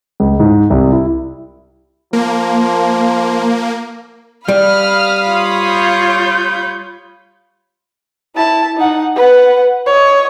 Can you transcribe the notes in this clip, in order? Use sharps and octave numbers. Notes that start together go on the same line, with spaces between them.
C#2
G#2
C2
E4
F3 A#3
G3 F5 B5 D#6 F6
F4 C#5
G6
E4 A5
D#4 F#5
B4 F#5
C#5 D#5